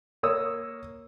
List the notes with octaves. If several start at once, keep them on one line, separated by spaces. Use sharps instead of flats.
A#3 C#5 D#6 E6